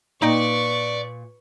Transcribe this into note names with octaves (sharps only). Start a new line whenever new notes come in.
A#2 D#4 B4 D5 D#5 G5 C#6